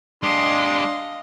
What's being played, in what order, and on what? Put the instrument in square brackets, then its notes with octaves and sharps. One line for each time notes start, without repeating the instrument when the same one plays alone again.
[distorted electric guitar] G#3 G4 [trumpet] D4 [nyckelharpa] D#5 F5 [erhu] C6